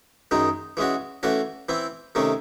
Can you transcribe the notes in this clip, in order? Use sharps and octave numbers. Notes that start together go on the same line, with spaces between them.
F#2 D#3 G#3 D#4
E3 G#3 C#4 F#4
E3 A3 C#4 F#4
E3 C4 E4
C3 D#3 A3 C#4